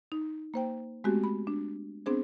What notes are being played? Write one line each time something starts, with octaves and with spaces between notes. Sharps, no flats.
D#4
A#3 C5 G5
G#3 A3 B3 C4 F#4 G4
B5
D4
B3 C4 D4 G#4 C5